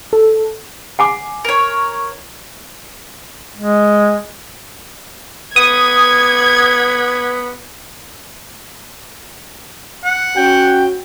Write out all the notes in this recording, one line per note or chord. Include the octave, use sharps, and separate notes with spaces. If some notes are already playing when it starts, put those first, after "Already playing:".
A4
F#5 G#5 D6
A#4 C#5
G#3
B3 D#6 G#6
F#5
C#4 F#4 G5